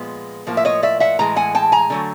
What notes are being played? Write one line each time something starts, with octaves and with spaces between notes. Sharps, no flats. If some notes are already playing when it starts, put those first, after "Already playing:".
Already playing: A#2 F3 G#3 B3
A2 F3 A#3
E5
C#5 D#5
D5 E5
E5 F#5
A2 E3 G#3 A#5
F#5 G#5
G5 A5
G#5 A#5
D3 F#3 A3